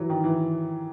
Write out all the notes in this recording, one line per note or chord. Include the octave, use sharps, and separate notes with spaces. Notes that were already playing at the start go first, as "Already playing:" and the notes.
Already playing: E3 F#3
D#3
E3